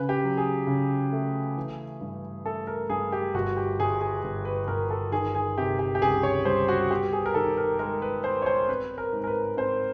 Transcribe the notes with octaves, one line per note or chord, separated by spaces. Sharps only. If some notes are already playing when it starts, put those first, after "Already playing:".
Already playing: C#3 B4
G4
F#3
G#4
C#3
A3
E3
G2
A3 A4
A#4
G2 G#4
G4
G1 F#4
G4
G1 G#4
G#4
G1
B4
G1 A#4
A4
D#3 G#4
G#4
C3 G4
G4
G4
C#2 G#4
C#5
G3 C5
F#4
B3 G4
G#4
A#4
D#3 A4
A#4
G#3 A#4
B4
B3 C5
C#5
C5
C4 B4
A#4
G#2
A#4
B4
C4 C5